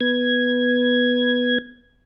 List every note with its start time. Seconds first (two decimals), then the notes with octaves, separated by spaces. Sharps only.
0.01 B3 G#6